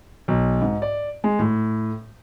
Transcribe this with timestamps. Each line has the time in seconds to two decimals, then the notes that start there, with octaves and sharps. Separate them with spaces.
0.28 B1
0.62 G#2
0.82 D5
1.24 G#3
1.39 A2